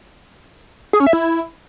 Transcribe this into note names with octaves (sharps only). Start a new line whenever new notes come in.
G#4
C#4
E5
E4